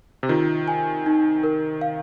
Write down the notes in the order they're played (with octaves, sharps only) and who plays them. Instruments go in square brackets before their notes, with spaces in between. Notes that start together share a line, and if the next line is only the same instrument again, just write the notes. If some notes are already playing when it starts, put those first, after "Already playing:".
[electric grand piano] C3
[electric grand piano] D#3 [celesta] F4
[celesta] G#5
D#4
A#4
F5